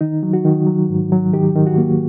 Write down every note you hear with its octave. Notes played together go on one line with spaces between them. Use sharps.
D#3 D#4
F#3
F#4
D#3
F#3
G#2
F#3
D#3 G4
D#3
F#4
A#3